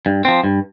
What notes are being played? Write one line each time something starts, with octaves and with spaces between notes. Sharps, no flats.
G2
F3 C4
G2